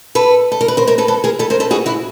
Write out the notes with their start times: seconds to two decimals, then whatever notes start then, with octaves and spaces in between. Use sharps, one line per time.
0.15 A4 B4
0.52 A4
0.61 A#4
0.68 B4
0.77 A#4 C5
0.87 A#4 C5
0.98 A4 B4
1.08 A4 B4
1.24 G#4 A#4
1.39 A4 B4
1.50 A#4 C5
1.60 A4 B4
1.71 F#4 G#4
1.86 E4 F#4